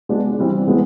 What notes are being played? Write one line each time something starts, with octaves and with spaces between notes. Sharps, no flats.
G#3 B3 D4 F4
E3 G3 C4
E3 G#3 B3 D4